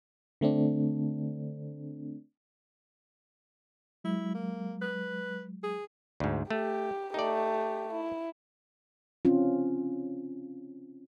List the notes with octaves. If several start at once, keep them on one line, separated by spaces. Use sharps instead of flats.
D3 A3 C4 D4
F#3 G#3 E4
A#3
B4
G#4
D2 G#2
A3 G4
A3 D#4 G4 D5
E4
C4 C#4 F4